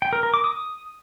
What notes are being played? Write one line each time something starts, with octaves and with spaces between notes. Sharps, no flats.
G5
A#4
A#4
D6
D#6